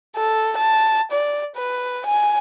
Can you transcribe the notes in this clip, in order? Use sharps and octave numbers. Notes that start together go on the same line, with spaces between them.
A4
A5
D5
B4
G#5